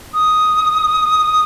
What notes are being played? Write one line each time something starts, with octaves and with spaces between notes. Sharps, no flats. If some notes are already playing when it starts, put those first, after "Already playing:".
D#6